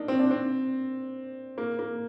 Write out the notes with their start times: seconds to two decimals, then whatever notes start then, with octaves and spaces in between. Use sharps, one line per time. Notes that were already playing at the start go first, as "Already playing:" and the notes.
Already playing: A#3 D4 D#4
0.08 C4
0.20 D4
0.31 C4
1.58 A#3
1.79 A#3